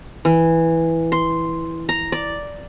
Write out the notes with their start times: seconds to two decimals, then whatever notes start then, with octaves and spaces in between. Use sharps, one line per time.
0.25 E3
1.12 C6
1.89 A#5
2.12 D5